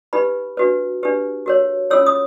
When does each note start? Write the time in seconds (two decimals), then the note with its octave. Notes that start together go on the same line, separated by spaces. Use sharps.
0.13 D#4 G4 B4 B5
0.57 D4 F#4 B4
1.03 D4 G4 B4
1.46 F#4 A#4 C#5
1.90 C#4 F4 A4 C#5 E6
2.06 D#6